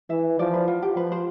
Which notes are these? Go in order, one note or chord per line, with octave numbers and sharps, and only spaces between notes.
E3 E5
F3 D5
B4
F4
G4
F3 B4
C5